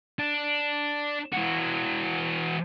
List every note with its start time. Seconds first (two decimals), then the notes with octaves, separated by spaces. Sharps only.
0.19 D4
1.33 E3 F#4